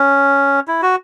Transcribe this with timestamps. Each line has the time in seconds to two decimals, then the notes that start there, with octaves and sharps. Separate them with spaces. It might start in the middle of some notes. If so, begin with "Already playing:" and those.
Already playing: C#4
0.68 E4
0.82 F#4